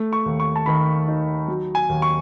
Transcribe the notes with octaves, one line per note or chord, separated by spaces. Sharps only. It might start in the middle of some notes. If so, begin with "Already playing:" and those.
Already playing: A3
C#6
D#2
C#6
A5
D#3 B5
D#4
F#3
G#5
D#2
C#6